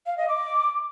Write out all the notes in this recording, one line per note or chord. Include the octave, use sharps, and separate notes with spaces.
F5
D#5
D6